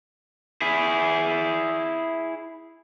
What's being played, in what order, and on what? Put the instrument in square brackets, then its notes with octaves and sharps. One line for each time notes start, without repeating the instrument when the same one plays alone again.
[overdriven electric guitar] E4 G#4